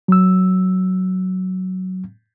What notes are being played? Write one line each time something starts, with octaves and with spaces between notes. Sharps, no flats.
F#3 E6